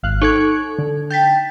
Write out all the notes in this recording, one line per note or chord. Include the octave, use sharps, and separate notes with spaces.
G#1 F5 F#6
D#4 A4 C#6 F#6 G#6
D3
G5 A5 G6 A6 B6